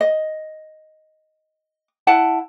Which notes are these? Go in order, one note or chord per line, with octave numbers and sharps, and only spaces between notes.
D#5
E4 F#5 A5